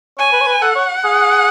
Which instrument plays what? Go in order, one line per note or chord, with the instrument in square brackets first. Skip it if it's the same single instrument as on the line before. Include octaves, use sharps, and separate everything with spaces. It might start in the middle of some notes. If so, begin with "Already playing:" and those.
[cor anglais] C#5 [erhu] G#5
[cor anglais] B4
C#5
B4
[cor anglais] A4 [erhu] F#5
[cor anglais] C#5
G#4